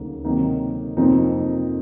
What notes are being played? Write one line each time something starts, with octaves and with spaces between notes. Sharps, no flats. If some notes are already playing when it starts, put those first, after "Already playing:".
Already playing: D2 C#3 F#3 A#3 D#4
C3 D#3 F#3 A#3 D#4
F2 C3 F3 A#3 D#4